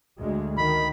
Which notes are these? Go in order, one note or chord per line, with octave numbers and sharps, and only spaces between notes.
D2 G#3
D#3 B5